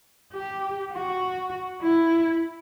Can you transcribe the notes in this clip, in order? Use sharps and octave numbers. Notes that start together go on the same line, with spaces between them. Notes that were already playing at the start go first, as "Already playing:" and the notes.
G4
F#4
E4